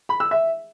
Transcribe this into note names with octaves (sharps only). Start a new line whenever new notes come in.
B5
E6
E5